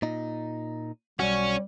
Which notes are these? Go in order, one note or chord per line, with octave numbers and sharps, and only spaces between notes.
A#2 D#4
B1 G3 C#4 F#4